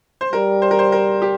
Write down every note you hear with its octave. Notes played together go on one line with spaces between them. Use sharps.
C5
G3 A#4
C5
A#4
C5
A#4
G4